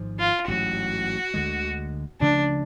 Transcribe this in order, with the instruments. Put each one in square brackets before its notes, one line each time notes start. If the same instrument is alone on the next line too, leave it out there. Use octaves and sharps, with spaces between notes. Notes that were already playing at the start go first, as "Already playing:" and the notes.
Already playing: [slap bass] G#1 G#2 F3
[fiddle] F4
[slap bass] A1 G#2 F#3 [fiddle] F#4
[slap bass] D2 D3 G#3
[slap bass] D2 C#3 F3 A3 [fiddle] D4